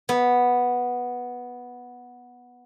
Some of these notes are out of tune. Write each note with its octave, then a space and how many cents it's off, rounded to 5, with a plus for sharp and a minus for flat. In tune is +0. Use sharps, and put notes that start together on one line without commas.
B3 -5